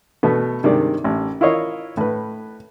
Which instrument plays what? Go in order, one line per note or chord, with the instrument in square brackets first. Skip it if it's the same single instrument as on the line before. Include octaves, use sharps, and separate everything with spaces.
[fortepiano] B2 A3 B3
G2 C3 D#3 G#3 D5
A1
E4 F4 A#4 C#5 D#5 F5
A2 B4